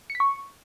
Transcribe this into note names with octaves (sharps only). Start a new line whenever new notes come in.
C#7
B6
C#6